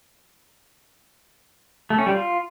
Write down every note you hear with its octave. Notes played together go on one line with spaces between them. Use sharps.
A3
C#4
G3
F4